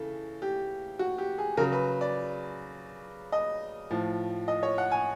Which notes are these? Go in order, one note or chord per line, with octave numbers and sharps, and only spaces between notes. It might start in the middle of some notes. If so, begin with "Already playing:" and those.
Already playing: C#3 E3 A4
G4
F#4
G4
G#4
C#3 F#3 A#4
B4
D5
D#5
A2 F3
D#5
C#5
F#5
G#5